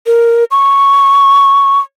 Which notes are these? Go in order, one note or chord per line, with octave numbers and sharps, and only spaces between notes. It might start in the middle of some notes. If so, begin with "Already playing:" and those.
A#4
C#6